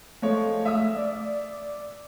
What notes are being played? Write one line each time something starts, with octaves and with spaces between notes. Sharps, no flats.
F3 G#3 A3 C#5
E5 D#6 E6
D5